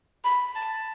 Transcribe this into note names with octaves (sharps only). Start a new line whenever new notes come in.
B5
A5